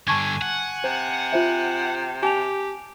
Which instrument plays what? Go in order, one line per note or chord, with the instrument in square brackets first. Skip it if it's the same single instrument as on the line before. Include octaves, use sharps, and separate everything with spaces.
[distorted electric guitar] G2 D3 [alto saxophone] G#5 [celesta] A5 C#6 G#6
[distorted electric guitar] F#5
[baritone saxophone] C3 [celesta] C5
[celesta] F4 C5 E5
[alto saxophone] G4 [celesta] G#5 A5 F7